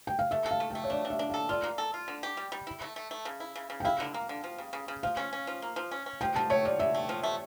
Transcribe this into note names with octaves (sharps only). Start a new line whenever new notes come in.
G5
F5
A3 E5
A4
F5
A3
A3 G5
C#5
D4 D5
D4
E5
D4
A4 F5
F4 D5
A#3
A4
F4
D3
G4
G3
G3
E4
A3
A3
A3
C#3
E4
C#3
C#3
G5
E4 F5
D3
A#3
D3
F3
C#3
C#3
C#3
F3 F5
C#4
C#4
F3
A#3
F3
C#4
C#4
F3 G5
F3 A5
A3 C#5
F3 D5
D3 E5
A3
F3
A3